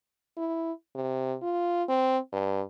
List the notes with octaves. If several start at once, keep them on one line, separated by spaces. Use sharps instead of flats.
E4
C3
F4
C4
G2